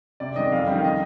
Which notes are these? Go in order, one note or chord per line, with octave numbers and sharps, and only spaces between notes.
C3 D5
D#3 G#3 D#5
F2 F5
D#3 G3
D#5